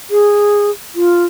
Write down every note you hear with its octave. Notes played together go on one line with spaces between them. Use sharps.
G#4
F4